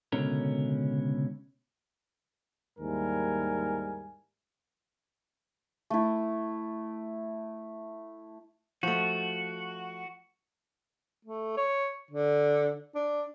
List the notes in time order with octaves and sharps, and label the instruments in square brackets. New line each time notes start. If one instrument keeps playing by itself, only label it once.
[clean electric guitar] C#2 B2 D3 C#4 A#4
[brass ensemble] D#2 G#2 G3 E4 A#4 G#5
[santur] A3 E4
[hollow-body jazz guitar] F3 A3 [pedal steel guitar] F#4
[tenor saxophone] A3
C#5
D3
D4